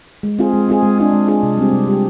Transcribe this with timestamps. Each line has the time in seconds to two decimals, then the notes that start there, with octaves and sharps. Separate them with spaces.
0.23 G#3
0.39 C4 F4 G#4
0.53 G#3
0.68 C4 F4 G#4
0.83 G#3
0.98 D4 F4 G#4
1.13 G#3
1.28 D4 F4 G#4
1.43 C3
1.58 G3 C4 G4
1.73 C3
1.88 G3 C4 G4